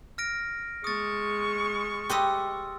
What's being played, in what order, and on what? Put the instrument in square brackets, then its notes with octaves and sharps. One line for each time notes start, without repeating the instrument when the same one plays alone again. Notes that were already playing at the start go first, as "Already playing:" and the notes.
[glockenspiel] F6 A#6 D7
[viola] G#3 C#6 [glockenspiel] D#6 A6
[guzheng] G4 B4 D#5 [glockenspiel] C6 E6